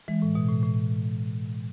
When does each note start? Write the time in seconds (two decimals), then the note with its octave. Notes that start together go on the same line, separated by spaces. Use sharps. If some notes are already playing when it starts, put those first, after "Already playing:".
0.08 E3 G#3
0.22 A2
0.35 B2
0.49 A2
0.63 A2